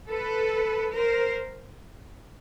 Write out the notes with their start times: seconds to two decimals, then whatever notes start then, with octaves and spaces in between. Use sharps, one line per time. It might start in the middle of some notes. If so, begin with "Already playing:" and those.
0.10 A4 B4
0.95 A#4 C5